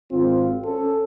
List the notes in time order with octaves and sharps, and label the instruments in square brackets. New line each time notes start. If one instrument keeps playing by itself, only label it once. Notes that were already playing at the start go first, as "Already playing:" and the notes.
[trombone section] G#1 C4 F4
C#4 A4